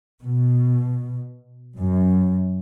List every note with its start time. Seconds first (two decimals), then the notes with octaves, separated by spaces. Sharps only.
0.20 B2
1.79 F#2